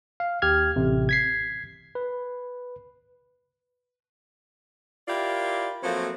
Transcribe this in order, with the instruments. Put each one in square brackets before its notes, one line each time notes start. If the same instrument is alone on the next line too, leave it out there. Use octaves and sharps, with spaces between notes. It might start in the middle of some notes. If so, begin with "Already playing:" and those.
[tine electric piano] F5
D#2 G4 F6 G#6
A1 C3
G#6 B6 C7
B4
[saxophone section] E4 F4 G4 A#4 D5 E5
F3 F#3 A3 A#3 C4